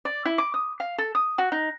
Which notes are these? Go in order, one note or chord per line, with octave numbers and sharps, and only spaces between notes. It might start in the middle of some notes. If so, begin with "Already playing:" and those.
D5
E4
D6
D#6
F5
A4
D#6
F#4
D#4